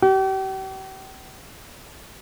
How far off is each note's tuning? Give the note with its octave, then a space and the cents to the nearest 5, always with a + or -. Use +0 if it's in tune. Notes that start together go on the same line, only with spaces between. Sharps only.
G4 -40